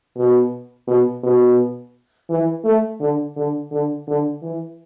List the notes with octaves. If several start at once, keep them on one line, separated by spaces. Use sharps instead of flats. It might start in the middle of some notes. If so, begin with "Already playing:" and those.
B2
B2
B2
E3
A3
D3
D3
D3
D3
E3